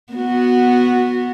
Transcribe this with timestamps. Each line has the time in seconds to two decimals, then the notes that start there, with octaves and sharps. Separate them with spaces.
0.13 B3 F#4